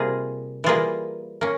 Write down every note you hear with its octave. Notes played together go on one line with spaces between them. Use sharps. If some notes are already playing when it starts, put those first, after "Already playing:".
Already playing: C3 G3 A#3 F4 G#4
E3 G3 A#3 F4 G#4
A#3 C#4